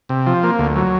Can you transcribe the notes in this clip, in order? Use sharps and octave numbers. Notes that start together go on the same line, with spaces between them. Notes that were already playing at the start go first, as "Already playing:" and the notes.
C3
F3
A#3
D2
F#3